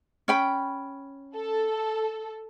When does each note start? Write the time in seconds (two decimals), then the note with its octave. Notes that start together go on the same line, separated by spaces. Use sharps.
0.28 C#4 G5 B5
1.36 A4